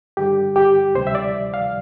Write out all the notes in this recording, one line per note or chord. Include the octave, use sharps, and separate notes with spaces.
G2 D3 G3 G4
G4
D2 C3 G3 C5
E5
D5
F5